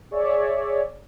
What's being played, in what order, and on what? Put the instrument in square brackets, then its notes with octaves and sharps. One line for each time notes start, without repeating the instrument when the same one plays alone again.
[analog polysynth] G#4 C#5 D5 E5